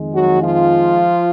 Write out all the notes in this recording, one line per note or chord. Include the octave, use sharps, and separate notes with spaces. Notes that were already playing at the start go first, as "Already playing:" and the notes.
Already playing: F2 D#3 G#3
F#3 F#4
F3 F4